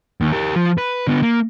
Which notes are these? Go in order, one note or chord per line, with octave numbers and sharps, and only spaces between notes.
D#2
G4 A#4
F3
B4
D3 B3
A#3